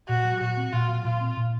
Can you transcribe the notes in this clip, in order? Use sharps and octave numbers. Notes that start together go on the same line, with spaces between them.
A#2 F#4
F#3
A#2 F#4
C4
A#2 F4
F#3
A#2 F4
C4
A#2